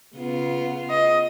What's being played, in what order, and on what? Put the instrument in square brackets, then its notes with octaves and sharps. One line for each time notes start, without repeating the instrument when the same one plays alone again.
[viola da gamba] C#3 B3 F4
[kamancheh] D#5